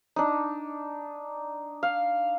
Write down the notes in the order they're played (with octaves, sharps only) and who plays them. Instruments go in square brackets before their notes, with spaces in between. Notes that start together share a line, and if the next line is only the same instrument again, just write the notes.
[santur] D4 D#4
F5